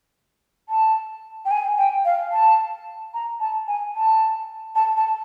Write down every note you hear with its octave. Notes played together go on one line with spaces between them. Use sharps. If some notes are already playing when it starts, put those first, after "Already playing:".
A5
G5
G#5
G5
F5
A5
A#5
A5
G#5
A5
A5
A5